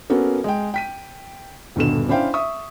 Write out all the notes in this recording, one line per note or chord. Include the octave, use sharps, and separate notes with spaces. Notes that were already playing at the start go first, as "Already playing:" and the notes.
A#3 B3 C#4 F#4 A4
G#3 G5
G5 B6 D#7
D#1 G2 B2 D3 E7
C#4 D4 E4 C5 F5 G5
E5 C#6 D#6